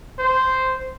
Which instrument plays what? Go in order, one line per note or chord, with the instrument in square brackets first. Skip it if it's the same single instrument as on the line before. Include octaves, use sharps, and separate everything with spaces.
[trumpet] C5